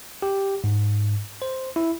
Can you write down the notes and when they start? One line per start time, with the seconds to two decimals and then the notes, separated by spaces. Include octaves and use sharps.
0.22 G4
0.64 G#2
1.42 C5
1.76 E4